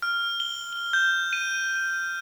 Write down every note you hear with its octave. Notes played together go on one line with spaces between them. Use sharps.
F6
G7
G7
G6
D#7